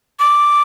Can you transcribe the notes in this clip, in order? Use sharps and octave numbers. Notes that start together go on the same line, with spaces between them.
D6